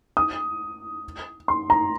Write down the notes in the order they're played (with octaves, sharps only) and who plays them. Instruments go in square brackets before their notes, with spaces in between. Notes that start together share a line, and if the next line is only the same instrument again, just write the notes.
[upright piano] D#6
C6
A#5